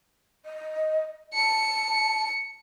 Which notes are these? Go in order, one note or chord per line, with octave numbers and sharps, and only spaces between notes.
D#5
A5 C#7